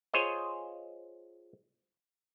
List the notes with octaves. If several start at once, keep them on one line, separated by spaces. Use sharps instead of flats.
F4 G#4 C5 C#5 D#5